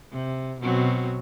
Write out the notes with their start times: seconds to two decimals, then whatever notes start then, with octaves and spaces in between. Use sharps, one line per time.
0.12 C3
0.61 B2 F#3 C4